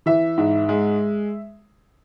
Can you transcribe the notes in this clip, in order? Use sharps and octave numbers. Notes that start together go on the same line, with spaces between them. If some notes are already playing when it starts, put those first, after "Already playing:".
E3 E5
G#2
G#3